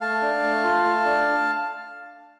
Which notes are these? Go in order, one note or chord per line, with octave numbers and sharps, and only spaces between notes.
A3 F5 A5
D4
A3
F4
A3
D4